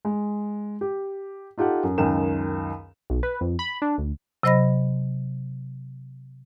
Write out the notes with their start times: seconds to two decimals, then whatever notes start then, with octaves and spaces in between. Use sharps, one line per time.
0.05 G#3
0.81 G4
1.58 D#4 F4 G4 A4 F#5
1.83 F#2
1.98 C#2 F#2 D#3 G5 E7
3.10 B1
3.23 B4
3.41 F2
3.59 B5
3.82 D4
3.98 D2
4.43 C3 F#3 C5 D#5 B5 A#6